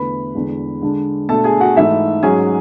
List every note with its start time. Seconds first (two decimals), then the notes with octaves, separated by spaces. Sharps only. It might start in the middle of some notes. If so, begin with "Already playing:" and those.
Already playing: E2 D3 A3 E4 B4 B5
0.35 E2 D3 G#3
0.82 D3 G#3 D4
1.29 B2 A3 D4 A4 A5
1.44 G#4 G#5
1.60 F#4 F#5
1.76 G#2 E3 A3 E4 E5
2.23 G#2 F#3 C#4 G#4 G#5